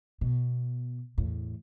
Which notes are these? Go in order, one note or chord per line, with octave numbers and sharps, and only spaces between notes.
B2
E2 A2